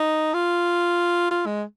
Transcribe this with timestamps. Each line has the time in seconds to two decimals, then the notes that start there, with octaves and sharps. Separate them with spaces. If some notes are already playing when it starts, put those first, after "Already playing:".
Already playing: D#4
0.34 F4
1.31 F4
1.46 G#3